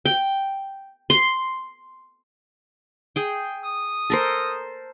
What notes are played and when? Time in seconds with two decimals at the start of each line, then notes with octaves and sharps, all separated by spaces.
0.05 G5
1.10 C6
3.16 G#4 G5
3.64 D#6
4.10 A4 A#4 C5